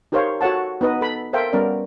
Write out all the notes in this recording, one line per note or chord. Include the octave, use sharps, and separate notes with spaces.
D#4 G4 A#4 C5 C#5 F5
F#4 A4 C#5 F#5 A5
B3 D#4 B4 D#5
A4 B5
A4 A#4 C5 E5 F5 G5
G3 B3 C#4 A#4 D5